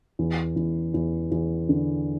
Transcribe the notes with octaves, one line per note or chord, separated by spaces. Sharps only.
E2
E2
E2
E2
D3